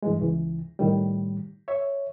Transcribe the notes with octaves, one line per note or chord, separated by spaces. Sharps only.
G2 E3 G#3
C#2 E3
A2 D#3 G3
C#5 E5